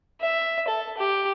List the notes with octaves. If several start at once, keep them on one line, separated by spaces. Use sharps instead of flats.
E5
A4
G4